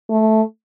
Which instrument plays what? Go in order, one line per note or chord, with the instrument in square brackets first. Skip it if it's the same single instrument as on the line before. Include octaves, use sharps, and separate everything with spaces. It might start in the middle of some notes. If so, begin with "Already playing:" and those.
[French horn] A3